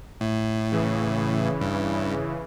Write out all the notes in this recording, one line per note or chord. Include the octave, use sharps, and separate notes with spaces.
A2
C#3 E3
G2